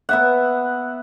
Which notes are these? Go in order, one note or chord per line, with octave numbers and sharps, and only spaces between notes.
B3 E5 F#5